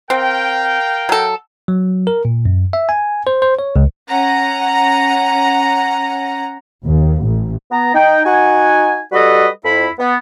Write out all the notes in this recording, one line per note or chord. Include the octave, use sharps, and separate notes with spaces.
C4 A#4 F5 G5
F#3 A4
F#3
A#4
A#2
F#2
E5
G#5
C5
C5
C#5
C#2
C#4 F#5 A#5
D#2
A1
B3 A#5
D#4 G5
D#4 F#4 F#5 G#5
G3 F#4 A4 B4 D#5
F2 E4 B5
B3